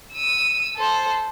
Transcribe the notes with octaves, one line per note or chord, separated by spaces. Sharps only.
E6 D#7
A4 C5